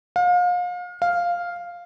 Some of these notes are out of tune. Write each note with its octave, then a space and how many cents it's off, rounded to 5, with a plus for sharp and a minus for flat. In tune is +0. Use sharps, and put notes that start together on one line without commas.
F5 +35
F5 +0